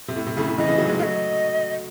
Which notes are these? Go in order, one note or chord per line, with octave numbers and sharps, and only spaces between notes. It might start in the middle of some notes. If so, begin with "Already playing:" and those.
C3
A2
C3
A2 C#3
A2 C#3
C#3 E3 D#5
C#3 E3
D#3 F#3
E3 G#3
F#3 A3 D#5 F5